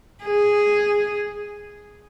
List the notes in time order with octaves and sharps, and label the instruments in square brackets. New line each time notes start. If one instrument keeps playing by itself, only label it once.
[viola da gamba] G#4